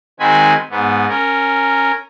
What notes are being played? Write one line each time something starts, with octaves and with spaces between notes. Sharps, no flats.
D#3 G#3 C4 F#4 G#5 B5
G#2 B3
C#4 A#4